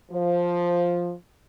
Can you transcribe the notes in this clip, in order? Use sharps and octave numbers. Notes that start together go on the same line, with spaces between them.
F3